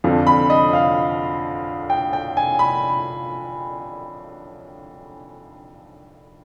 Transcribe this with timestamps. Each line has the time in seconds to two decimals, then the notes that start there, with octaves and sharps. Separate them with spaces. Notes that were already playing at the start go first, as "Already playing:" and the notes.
0.04 F2 D3 F3 C4
0.27 B5
0.50 D#5
0.73 F5
1.90 G5
2.13 G5
2.37 G#5
2.59 B5